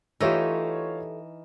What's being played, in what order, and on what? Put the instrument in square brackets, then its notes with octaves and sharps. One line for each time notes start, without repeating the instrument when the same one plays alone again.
[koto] E3 D#4 [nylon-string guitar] A3 G4 [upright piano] F4 C#5 E6